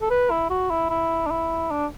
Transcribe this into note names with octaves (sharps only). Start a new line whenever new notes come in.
A4
B4
E4
F#4
E4
E4
D4
E4
D4